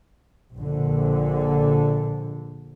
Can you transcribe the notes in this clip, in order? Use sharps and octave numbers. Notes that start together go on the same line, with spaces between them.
A#1 D3